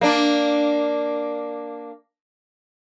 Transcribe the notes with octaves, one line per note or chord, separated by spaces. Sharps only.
A#3 D4